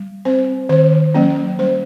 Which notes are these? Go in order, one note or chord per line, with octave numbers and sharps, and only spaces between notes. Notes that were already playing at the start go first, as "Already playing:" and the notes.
Already playing: G3
C4 C5
D#3 C5
F#3 A#3 C#4
G3 C5